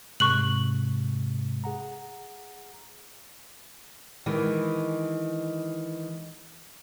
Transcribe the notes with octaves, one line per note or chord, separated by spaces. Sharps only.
G#2 C3 G#3 C#6 F#6 F#7
G#4 F#5 A#5
D#3 E3 G#3